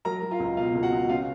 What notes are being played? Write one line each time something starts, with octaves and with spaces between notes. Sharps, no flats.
F#3 A#4 A#5
F#3
F4 F5
C#2
B2 F4 F5
C#2
F#4 F#5
C#2
C#3 F4 F5